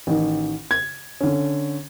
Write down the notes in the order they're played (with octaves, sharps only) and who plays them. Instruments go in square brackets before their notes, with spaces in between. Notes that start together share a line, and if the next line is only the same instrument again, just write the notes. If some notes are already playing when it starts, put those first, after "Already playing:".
[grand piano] A1 D#3
G#6
D3 C#4